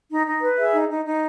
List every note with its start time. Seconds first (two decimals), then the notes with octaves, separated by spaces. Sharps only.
0.10 D#4
0.26 D#4
0.42 B4
0.57 G#4 E5
0.73 D#4
0.90 D#4
1.05 D#4